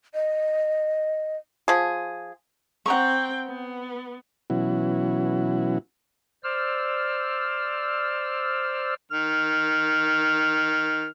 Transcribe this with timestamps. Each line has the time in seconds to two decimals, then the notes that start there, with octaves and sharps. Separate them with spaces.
0.14 D#5
1.68 F3 G#4
2.86 C4 F#5 G5 A#5 C#6
3.46 B3
4.50 B2 E3 F#3 C#4 E4 F#4
6.44 C5 D5 E6 F6
9.12 D#3 F6